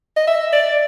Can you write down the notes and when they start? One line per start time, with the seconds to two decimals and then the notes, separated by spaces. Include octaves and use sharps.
0.16 D#5
0.27 E5
0.53 D5